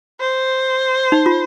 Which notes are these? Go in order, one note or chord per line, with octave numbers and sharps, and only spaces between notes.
C5
D#4
F4